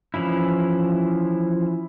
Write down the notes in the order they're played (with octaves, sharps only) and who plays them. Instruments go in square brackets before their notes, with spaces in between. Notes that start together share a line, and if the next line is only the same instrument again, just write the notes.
[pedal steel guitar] E3 F3 C#4 E4